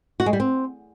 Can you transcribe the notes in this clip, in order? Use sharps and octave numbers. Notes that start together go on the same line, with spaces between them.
F#4
G#3
G3
C4